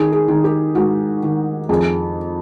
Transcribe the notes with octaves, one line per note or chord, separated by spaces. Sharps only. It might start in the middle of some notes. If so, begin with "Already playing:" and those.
Already playing: D#3 G#4
G#4
D#3
G4
G#2 F#4
D#3
F2 G#4